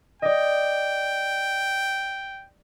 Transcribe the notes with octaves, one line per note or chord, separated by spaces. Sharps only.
D5 D#5 G5